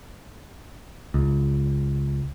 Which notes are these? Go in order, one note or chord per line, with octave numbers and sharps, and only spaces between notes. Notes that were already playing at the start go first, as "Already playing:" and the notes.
C#2